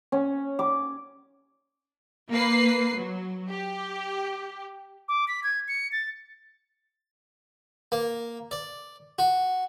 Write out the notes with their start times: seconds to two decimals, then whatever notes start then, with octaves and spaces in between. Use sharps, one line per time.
0.12 C#4
0.59 D6
2.30 A#3 B4 C7
2.96 F#3
3.49 G4
5.08 D6
5.28 B6
5.43 G#6
5.68 C#7
5.92 A6
7.92 A#3
8.51 D5
9.19 F#4